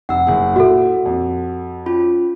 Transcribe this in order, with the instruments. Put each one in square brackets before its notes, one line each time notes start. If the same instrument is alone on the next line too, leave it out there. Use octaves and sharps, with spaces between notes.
[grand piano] F1 [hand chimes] F#5 E6
[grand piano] F#1 G#4
[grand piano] A#2 E4 [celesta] F#4 A4
[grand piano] F2
[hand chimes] C#4 F4 B5